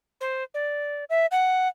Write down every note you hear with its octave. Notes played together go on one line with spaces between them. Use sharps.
C5
D5
E5
F#5